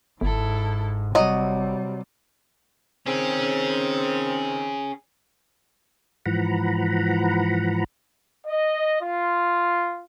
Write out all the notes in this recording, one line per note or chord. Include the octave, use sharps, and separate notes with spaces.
G1 G#2 E4 A4
C3 F#3 G3 D#5
D#3 C4 C#4 G#4
G#2 E3 F3 F#5 A#5 B5
D#5
F4